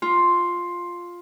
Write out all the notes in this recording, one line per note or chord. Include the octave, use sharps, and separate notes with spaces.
F4